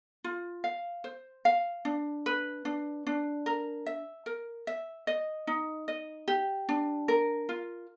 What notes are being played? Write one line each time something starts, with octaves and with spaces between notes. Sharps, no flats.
F4
F5
C5
F5
D4
B4
D4
D4
A#4
E5
A#4
E5
D#5
D#4
D#5
G4
D4
A#4
F4